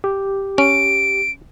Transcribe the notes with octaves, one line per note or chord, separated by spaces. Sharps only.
G4
C#4 D7